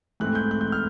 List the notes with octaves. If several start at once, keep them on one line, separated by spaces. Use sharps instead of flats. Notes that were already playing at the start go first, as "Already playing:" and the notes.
G#2 E3 A3 C4 F#6
G6
F#6
G6
F6